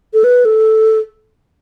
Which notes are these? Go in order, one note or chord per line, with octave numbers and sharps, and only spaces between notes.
A4
B4
A4